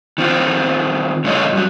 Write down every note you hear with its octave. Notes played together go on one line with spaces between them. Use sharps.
D#3 C4 F4
G2 C#3 A3 F4 C#5 D#5
G2 F#3